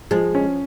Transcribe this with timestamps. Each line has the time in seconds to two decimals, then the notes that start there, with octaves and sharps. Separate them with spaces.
0.11 F3 G#3
0.35 C#4